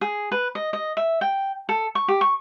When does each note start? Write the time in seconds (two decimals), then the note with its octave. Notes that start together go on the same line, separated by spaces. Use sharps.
0.01 G#4
0.32 B4
0.55 D#5
0.73 D#5
0.97 E5
1.21 G5
1.69 A4
1.95 C#6
2.08 G4
2.21 C#6